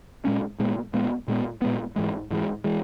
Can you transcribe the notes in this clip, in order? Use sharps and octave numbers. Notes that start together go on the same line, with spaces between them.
A#2 G#3 C#4
A#2 G#3 B3
A#2 G#3 B3
A#2 G#3 B3
A#2 G#3 B3
G#2 E3 G#3
G#2 E3 G#3
E3 G#3